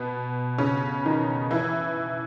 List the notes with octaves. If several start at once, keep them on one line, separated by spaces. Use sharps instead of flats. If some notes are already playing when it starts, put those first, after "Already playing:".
Already playing: B2 B3
C#3 C#4
D#3 D#4
E3 E4